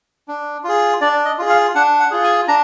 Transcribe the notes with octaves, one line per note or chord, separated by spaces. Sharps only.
D4
F4 G#4
D4 D5
D#5
F4 G#4
F5
D4 F#5
F#5
F4 G#4
G#5
D4 A#5